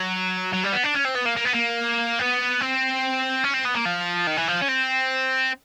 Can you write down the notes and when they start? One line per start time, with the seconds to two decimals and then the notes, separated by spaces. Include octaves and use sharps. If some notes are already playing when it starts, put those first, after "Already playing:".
Already playing: F#3
0.53 F#3
0.64 G3
0.73 B3
0.84 D4
0.95 C#4
1.05 C4
1.15 B3
1.26 A#3
1.37 A#3
1.45 B3
1.54 A#3
2.19 B3
2.61 C4
3.44 C#4
3.54 C4
3.65 B3
3.75 A#3
3.85 F3
4.27 D#3
4.37 E3
4.48 F3
4.61 C#4
4.68 C4